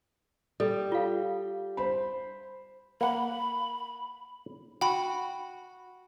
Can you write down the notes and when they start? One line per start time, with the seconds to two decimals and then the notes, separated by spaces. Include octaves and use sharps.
0.60 G3 A4
0.92 F4 F5
1.77 C5 B5
3.01 A#3 F#5 B5
4.81 F#4 G5 B5